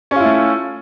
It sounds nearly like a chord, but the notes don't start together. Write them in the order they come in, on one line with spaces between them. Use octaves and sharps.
C#4 F4 E4 A3